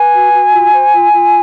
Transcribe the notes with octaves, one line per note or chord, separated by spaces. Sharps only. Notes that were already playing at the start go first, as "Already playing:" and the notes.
Already playing: B4 G#5
F#4
F#4
F4
C5
F4
F4